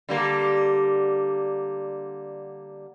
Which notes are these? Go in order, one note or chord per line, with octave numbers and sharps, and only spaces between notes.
D3 G3 A#3